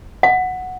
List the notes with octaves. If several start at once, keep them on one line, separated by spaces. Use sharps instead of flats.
F#5